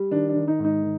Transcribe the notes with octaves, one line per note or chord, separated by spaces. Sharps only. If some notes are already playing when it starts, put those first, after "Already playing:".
Already playing: G3
D#3 D4
D4
D#3
D#4
G#2
D#4
D#3